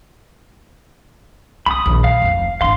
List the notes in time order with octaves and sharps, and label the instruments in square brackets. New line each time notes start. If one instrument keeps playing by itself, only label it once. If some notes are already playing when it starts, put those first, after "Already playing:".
[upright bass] C2 [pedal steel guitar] B5 D#6
[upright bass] A#1 D#2
[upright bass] F#3 [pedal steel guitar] F5
[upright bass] F1 D2
[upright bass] G#1 D3 [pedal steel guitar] F5 C6